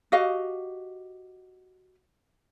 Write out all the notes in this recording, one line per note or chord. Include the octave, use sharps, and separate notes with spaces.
F#4 G4 D#5 F5